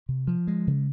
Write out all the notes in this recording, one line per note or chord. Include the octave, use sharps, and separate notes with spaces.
C3
F3
G#3
C#3